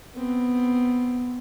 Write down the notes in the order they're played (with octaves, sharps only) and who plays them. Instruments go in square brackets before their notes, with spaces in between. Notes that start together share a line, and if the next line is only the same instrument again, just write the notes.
[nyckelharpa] B3 C4